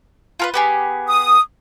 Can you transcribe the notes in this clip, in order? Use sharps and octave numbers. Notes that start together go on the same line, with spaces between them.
F4 A#4 B4
B3 G4 G#4
D#6